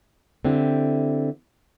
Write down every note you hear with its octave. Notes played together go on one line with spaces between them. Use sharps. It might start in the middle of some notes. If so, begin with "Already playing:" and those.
D3 C4 E4 G4